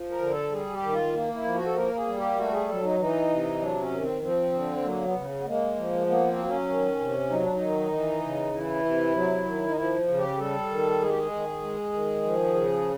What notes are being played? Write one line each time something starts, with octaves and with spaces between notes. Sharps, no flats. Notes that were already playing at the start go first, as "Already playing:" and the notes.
Already playing: F3
A#4
D3
A4
G3 G#4
G4
D#3
F4
A#3
E4
F3
F#4
A4
A#3 A#4
G#4
G3
G4
A3 F#4
G#4
F#3 A4
D#4
E3 D#4
C3
F#3 D4
C#4
D#3
C4
F3 C4
D3
F#3 A#3
B3
C#3
B3
G#3 A#3
F3
A#3 B3
C4
F#3
C#4
D#3
C3
F#3 D#4
D4
D#4
D#3
E3
C#3
E3 E4
C3
F#3
D#3
D#4
F3 E4
C#3
G4
G3 A4
D#3
G#3 G#4
G4
G#4
D#3
G#3
D#3
F3
C#3